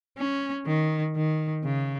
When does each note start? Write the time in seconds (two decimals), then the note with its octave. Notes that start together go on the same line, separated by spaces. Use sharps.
0.18 C#4
0.67 D#3
1.16 D#3
1.64 C#3